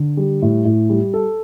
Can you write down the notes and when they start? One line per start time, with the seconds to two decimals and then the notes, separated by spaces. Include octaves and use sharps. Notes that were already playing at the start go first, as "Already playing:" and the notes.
Already playing: D3
0.17 G3
0.42 A2
0.65 A2
0.90 G3
1.14 A4